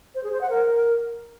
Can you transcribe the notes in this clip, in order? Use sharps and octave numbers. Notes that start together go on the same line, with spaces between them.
C5
G#4
C5
F#5
A#4